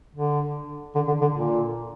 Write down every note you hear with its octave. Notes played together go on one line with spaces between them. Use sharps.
D3
D3
D3
D3
A#2